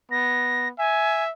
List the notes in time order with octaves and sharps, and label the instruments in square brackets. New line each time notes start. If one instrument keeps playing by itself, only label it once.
[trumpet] B3 [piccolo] A#6
[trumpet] E5 [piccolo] G#5